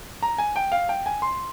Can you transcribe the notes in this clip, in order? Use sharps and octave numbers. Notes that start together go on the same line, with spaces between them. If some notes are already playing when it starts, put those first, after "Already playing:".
A#5
G#5
G5
F5
G5
G#5
C6